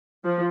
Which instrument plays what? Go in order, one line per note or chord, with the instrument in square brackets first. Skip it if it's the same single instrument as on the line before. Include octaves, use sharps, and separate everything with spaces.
[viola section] F3